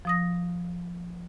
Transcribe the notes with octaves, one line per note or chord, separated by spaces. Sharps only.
F3 D#6 A#6